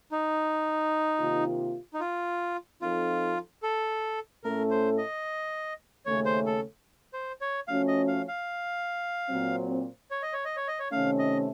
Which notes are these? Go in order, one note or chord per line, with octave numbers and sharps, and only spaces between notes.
D#4
C3 D#3 A#3 F4
D#4
F4
F3 C4 D#4 F4 A4
A4
A2 A3 C#4 A4 A#4
C5
D#5
D#2 C#3 A3 C#4 C#5
C5
A4
C5
C#5
F3 A3 C#4 F#4 F5
D#5
F5
F5
A#2 F#3 C4
C#5
D#5
C#5
D#5
C#5
D#5
C#5
C3 D#3 A3 C#4 F5
D#5